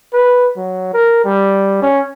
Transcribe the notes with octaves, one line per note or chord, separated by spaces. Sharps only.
B4
F#3
A#4
G3
C#4